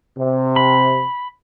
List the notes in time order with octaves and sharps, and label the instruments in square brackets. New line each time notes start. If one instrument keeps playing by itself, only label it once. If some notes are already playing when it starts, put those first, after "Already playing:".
[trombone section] C3
[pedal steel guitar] B5